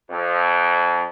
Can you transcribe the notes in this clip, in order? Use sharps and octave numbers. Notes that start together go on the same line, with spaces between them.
F2